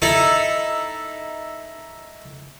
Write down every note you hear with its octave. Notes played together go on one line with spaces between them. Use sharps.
D#4 E4 A4